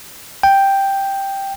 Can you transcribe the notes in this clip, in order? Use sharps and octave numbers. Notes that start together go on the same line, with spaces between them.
G5